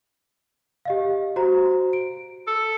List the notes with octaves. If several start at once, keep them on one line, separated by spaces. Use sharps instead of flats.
G4 D#5 F5
F#4 C5 A#5
D7
A4